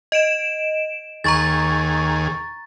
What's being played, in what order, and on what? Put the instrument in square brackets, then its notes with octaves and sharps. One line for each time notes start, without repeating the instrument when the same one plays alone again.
[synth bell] D#5 D7 E7
[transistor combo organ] D#2 G#4 [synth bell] A#5 C#6 A6